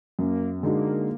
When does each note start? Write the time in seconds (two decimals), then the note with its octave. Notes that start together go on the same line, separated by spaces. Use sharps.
0.19 F#2 A#3
0.57 B3
0.63 D3 G#3 A#3 D#4 F#4